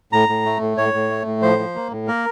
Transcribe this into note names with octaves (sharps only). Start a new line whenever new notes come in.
A2 A#5
A2
A3
A2
A2 C#5
A2
A3
A2
F3 C5
F3
A#3
A2
A#3 A#4